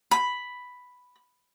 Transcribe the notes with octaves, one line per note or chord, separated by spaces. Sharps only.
B5